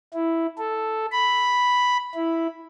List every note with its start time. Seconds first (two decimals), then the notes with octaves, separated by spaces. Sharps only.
0.13 E4
0.58 A4
1.12 B5
2.15 E4